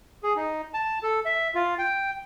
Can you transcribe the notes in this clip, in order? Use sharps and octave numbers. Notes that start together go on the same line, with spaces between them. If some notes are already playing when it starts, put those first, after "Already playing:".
G#4
D#4
A5
A4
E5
F4
G5